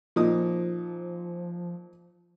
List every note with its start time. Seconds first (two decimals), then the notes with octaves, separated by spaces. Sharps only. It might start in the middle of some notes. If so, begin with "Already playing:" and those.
0.16 A#2 F3 D#4 D#6